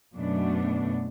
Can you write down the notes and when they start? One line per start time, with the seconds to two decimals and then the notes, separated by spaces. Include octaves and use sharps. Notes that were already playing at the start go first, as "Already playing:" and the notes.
0.15 F#2 B2 A3 B3 D4